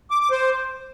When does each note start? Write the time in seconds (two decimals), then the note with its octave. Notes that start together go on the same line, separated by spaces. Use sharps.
0.11 D6
0.21 D6
0.31 C5